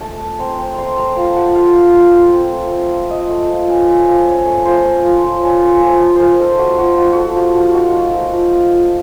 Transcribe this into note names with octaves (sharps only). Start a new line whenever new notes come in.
A3 A5
A3
C4 A#5
C4
A3 A#5 C6
C4 A#5
F4 A5
F4 F#5
A3 F5
A3
F4
F4
C4
A3
A3
F4
A3 D#5
A3
F3
C#4
F3
F3
C#4
A3
F3 C5
A3
F3
F3
C#4
C#4
F3
A3
F3 A#4 C5
D#4 A4
A3 F#4
F3 F#4
F3 F#4
F3 F#4 A4
F3 F#4
F3 F#4
D#4 F#4
A3
F3 A#4
F3
A3
F3